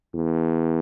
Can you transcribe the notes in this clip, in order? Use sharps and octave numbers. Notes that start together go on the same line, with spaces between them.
E2